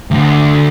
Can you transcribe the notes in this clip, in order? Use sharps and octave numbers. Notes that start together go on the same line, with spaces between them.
D2